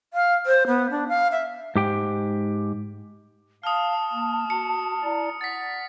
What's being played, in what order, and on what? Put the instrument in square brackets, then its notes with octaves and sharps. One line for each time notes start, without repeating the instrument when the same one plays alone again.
[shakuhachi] F5
C5
B3
D4
F5
E5
[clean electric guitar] G#2 G4 G5
[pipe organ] F5 [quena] A5 [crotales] D#6 F6
[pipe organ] A#3
[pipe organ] F#4 [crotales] C#7
[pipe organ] E4 D5 A#5
[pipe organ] F#5 [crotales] A6 B6